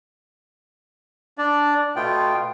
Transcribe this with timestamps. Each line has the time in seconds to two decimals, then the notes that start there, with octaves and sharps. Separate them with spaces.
1.38 D4 D5
1.96 B2 A3 B3 F4 G5